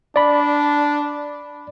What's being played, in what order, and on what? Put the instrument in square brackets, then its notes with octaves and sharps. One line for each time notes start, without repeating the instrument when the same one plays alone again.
[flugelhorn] D4 [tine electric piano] D5 B5